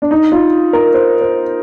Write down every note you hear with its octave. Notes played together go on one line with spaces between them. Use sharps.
D4
D#4
F4
A#4
C5
C5